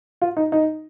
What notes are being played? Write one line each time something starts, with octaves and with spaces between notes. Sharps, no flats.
F4
D#4
D#4